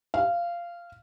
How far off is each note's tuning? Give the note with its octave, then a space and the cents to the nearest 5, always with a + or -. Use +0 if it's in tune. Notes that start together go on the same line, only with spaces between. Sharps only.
F5 -15